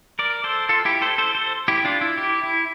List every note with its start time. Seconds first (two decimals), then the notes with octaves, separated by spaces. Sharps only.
0.19 A#4 D5
0.44 A4 C5
0.69 F4 A4
0.85 E4 G4
1.02 A4 C5
1.18 A4 C5
1.35 A4 C5
1.68 E4 G4
1.85 D4 F4
2.01 E4
2.17 E4 G4
2.43 E4